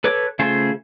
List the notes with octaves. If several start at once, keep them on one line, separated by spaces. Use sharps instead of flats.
A4 B4 C#5 D6
C#3 A3 F4 G#4 C5